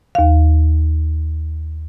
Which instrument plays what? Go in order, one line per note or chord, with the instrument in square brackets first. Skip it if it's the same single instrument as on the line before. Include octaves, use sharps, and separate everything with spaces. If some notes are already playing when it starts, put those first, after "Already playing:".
[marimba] D#2 F5